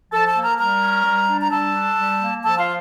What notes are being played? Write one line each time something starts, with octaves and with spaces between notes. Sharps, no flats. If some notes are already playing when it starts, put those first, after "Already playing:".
F3 A4 A5
A4 A5
A#3
A#4 A#5
G3 A#4 A#5
C#4
G3
D4
A#5
G3 A4 A5
D4
G3
A#3
F3 A4 A5
F4 F5